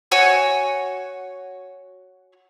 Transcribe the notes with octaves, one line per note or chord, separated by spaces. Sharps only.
F#4 C#5 G#5 C#6